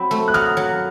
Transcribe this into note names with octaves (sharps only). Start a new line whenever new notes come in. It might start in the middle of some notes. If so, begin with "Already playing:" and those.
Already playing: F#3 C4 B5
A3
F#6
F#3 D#6 F6
F#3